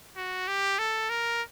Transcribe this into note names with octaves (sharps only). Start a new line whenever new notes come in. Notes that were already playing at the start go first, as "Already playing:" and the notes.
F#4
G4
A4
A#4